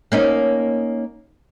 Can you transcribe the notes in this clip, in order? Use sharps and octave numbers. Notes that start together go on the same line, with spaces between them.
A#3 C#4 D#4